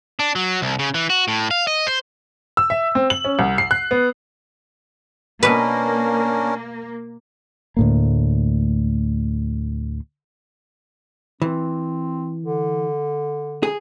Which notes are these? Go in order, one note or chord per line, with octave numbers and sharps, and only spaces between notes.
D4
F#3
C2
C#3
E3
F#4
A2
F5
D#5
C5
E6
E5
C4
F#7
C#4
C2
C7
F#6
B3
B2 A#3 C#4 D4 A#4 B4
D2 A2 A#3
E3 C4
D3
G#4